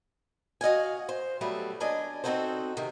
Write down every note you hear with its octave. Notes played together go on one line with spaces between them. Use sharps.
F#4 D#5 F5 G#5
C5
F#3 G3 A3 B3 E5
A#3 C#4 D4 D#5 G#5
C4 C#4 D#4 F#4 A4 C5
C3 D#3